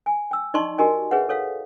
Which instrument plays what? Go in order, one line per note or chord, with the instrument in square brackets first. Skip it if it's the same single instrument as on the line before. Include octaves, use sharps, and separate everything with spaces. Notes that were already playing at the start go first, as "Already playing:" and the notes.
[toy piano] G#5
G5 E6
D#4 D5 D#5 A5 C6 C#6
F#4 G4 A#4 D#5 G#5
G#4 B4 C#5 E5 F#5
A4 C#5 F5